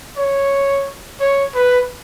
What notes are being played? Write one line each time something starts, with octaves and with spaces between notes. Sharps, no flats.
C#5
C#5
B4